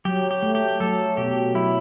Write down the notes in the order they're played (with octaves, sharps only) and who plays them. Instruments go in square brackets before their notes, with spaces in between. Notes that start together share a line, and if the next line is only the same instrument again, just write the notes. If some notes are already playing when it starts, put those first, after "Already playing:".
[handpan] F#3 [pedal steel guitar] G4
[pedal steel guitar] G4
[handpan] A3
[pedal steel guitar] G4
[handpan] F#3 [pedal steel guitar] A4
[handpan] B2 [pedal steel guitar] G4
[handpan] F#3 [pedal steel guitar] E4